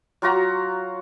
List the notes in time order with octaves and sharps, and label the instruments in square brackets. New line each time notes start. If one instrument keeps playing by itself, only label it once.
[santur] F#3 F4 F#4 A#5